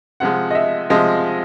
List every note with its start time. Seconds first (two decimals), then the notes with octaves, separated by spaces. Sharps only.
0.20 C3 F3 G#3 F#5
0.51 D#5
0.55 E5
0.90 C3 F3 G#3 D#5